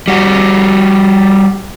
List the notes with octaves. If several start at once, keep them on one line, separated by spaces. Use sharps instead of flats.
G3 F#4